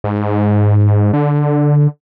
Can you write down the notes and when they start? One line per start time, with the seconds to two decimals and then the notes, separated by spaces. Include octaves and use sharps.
0.04 G#2
1.13 D3